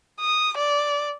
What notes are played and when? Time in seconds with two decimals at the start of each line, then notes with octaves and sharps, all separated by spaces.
0.20 D#6
0.57 D5